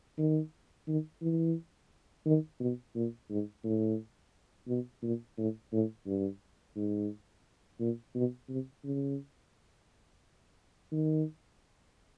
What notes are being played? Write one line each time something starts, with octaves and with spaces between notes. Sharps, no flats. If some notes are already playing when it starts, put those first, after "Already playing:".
D#3
D#3
E3
D#3
B2
A#2
G#2
A2
B2
A#2
A2
A2
G2
G#2
A#2
B2
C3
C#3
D#3